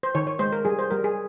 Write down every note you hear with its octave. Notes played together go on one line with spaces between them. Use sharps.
C5
D#3 C#5
C#5
G#3 C5
A#4
G3 G#4
C5
G3 A#4
G#4